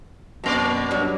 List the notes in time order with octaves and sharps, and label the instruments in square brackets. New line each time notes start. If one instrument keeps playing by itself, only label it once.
[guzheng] F#2 C6 [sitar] B2 A#3 D5
[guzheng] F#3 G3 D4